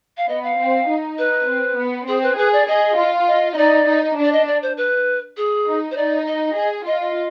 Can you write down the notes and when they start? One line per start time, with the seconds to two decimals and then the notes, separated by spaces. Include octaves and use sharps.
0.17 F5
0.29 B3 D#5
0.43 F5
0.58 C4
0.88 D#4
1.18 B4
1.48 C4
1.78 B3
2.08 C4 G#4
2.22 B4
2.37 G#4 B4
2.52 D5
2.67 G#4 D#5
2.97 F4
3.27 D#5
3.52 D#5
3.57 D#4 D5
3.87 D#4
4.17 D4
4.23 D5
4.32 D#5
4.47 D5
4.62 C5
4.77 B4
5.37 G#4
5.66 D#4
5.91 C5
5.96 D#4 D5
6.26 D#5
6.56 G#4
6.86 F4 D#5
7.01 D#5